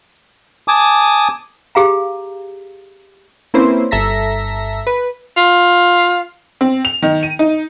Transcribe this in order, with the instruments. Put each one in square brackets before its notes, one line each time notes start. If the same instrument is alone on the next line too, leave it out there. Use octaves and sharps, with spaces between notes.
[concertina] G#5 A5 D6 D#6
[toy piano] G4 G#4 F5 A#5
[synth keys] A#3 C4 C#4 E4 B4 C5
G1 A4 E5 A#5 A#6 B6
B4
[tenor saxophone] F4
[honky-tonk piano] C4
F7
D#3
D#7
D#4